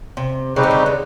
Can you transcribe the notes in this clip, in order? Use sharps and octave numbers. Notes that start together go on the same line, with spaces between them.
C3
C#3 G3 C4 D#4 G4 B4
D3
C#3
D3